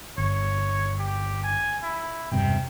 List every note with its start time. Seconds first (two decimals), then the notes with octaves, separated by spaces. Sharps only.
0.18 G1 C#5
0.99 G4
1.43 G#5
1.83 E4
2.32 E1 G2 C3 G5